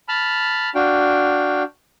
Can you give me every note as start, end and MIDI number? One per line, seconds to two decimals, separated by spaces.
0.09 0.70 81
0.09 0.70 83
0.09 0.70 89
0.75 1.63 62
0.75 1.63 66
0.75 1.63 77
0.75 1.63 79